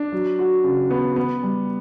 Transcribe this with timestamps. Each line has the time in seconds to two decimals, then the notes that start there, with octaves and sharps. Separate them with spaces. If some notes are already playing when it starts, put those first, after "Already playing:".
Already playing: D4
0.12 F#3
0.39 F#4
0.64 C#3
0.91 B3
1.16 B3
1.43 G3